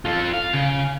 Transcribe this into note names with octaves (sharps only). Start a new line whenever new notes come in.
F4 A4
F5
C#3